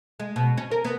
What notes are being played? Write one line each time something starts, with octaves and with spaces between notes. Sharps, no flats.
G#3
B2
C#4
A#4
B3